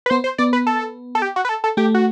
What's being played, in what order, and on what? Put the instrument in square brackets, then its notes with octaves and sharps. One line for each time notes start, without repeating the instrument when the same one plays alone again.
[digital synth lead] B4
[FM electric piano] B3 [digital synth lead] C5
[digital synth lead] C5
[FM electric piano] B3 [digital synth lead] D5
[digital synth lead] B4
A4
A4
G4
F#4
B4
A4
A4
[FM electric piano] A3 [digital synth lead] G4
[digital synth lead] F#4